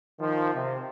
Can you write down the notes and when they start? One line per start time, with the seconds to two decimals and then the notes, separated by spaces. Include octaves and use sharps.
0.19 D#3 F3
0.54 C3